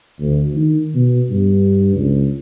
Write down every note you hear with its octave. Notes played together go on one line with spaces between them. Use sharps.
D2
D#3
B2
G2
C#2